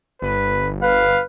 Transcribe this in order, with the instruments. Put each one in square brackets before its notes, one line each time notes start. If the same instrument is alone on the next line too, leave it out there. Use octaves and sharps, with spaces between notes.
[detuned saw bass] G1 [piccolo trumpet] B4
[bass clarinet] B4 [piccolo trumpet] F5